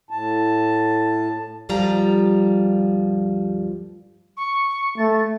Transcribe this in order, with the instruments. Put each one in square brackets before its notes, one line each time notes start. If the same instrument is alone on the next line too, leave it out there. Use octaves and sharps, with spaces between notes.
[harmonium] A2 A5
[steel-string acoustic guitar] D2 G2 F3 G3 F4 A#5
[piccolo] C#6
[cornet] A3 [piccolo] A6